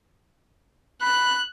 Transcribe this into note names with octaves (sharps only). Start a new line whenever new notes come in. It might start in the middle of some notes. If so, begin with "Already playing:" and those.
B5 F#6